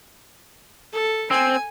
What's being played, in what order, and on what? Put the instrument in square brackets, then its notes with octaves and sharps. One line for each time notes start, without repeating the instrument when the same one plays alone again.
[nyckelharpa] A4
[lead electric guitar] C4 [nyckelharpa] G#5